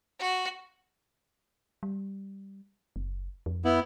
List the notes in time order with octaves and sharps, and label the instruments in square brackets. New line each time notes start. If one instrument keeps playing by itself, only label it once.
[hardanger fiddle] F#4
[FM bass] G3
F#1
F2
[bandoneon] B3 E4